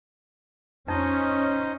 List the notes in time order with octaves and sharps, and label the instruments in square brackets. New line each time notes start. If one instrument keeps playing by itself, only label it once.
[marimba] F2 [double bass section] C#4 [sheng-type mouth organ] D#4 C5 D#5